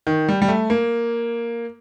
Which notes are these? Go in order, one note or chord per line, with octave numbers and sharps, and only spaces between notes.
D#3
G3
G3
A3
A#3